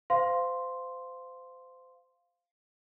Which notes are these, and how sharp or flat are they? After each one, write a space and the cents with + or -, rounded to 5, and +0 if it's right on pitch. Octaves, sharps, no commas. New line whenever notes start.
C5 -25 F5 +0 C6 +0